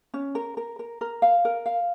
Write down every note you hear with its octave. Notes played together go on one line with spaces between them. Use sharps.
C#4
A#4
A#4
A#4
A#4
F5
A#4
F5